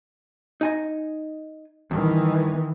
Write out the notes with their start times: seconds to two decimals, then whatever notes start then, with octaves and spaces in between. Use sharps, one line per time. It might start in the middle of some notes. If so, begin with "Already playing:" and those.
0.61 D#4 G#5 A#5
1.91 E2 G2 D#3 E3